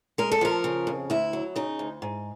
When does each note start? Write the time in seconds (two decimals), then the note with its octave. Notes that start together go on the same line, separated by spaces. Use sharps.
0.18 G#3 A#4
0.32 A4
0.41 F3 A#4
0.64 C#3
0.87 F2
1.10 D2 E4
1.33 F#3
1.56 C#3 D#4
1.79 D2
2.02 G#2